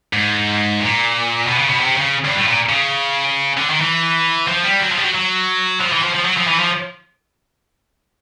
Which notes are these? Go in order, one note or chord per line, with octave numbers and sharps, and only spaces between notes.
G#2
A#2
B2
C#3
B2
C3
C#3
G2
A2
A#2
C#3
D3
D#3
E3
F3
G3
F#3
F3
G3
F#3
F#3
F3
E3
F3
F3
F#3
F3
E3
F3